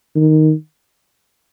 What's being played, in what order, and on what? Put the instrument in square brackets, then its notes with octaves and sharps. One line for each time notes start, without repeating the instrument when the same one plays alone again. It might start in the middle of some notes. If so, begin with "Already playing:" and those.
[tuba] D#3